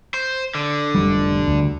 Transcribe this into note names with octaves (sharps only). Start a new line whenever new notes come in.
C5
D3
F1 C#2 G3
D2